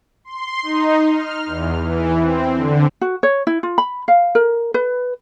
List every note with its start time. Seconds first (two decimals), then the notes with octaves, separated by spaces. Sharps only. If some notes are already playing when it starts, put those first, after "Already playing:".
0.25 C6
0.63 D#4
1.12 F6
1.46 E2
1.79 E3
2.20 C4
2.55 D3
3.01 F#4
3.23 C#5
3.47 E4
3.63 F4
3.78 B5
4.08 F5
4.35 A#4
4.74 B4